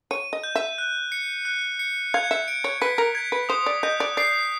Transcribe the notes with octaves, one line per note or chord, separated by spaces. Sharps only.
C#5 D#7
D#5
G6
E5
F#6
C#7
F#6
C#7
F5 G#6
E5
D7
C#5
B4 B6
A#4
G#6
B4
C5 D#6
D5
D#5 G6
D5
D5 C7